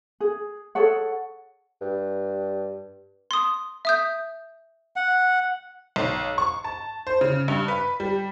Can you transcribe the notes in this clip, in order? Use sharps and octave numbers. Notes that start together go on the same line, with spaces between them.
G#4
G#4 A4 C#5 F#5
G2
C6 D#6
E5 D#6 G6
F#5
B1
C#6
A5
C5
C#3
G2
B4
G3